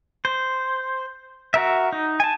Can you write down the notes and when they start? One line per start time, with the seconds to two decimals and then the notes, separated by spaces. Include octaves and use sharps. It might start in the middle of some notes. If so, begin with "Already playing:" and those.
0.25 C5
1.54 F#4 A#4 E5
1.92 D#4
2.20 G#5 A5